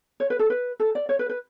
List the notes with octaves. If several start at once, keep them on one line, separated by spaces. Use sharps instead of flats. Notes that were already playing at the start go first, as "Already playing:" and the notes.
C#5
B4
A4
B4
A4
D5
C#5
B4
B4